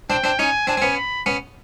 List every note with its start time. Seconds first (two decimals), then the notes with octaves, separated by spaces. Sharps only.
0.10 C4 D4 G5
0.24 C4 D4
0.39 C#4 D#4 G#5
0.67 C4 D4 G#5
0.77 C4
0.82 B3 C#4
0.97 B5
1.26 B3 C#4